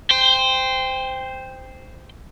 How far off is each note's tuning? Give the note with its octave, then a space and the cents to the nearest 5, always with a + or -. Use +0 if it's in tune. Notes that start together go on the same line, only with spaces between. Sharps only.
C5 -10 G5 +15